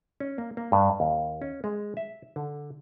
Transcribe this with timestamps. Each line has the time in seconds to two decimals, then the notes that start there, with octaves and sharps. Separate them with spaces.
0.20 C#4
0.38 A#3
0.57 A#3
0.72 G2
1.00 D#2
1.42 C#4
1.64 G#3
1.97 E5
2.36 D3